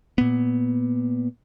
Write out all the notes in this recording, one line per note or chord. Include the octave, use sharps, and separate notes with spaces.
A#2 B3